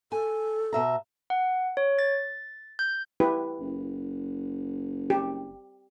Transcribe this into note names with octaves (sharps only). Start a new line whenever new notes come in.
A4 G#5
B2 E5 A#5
F#5
C#5
A6
G6
E4 G4 B4
F#1
G4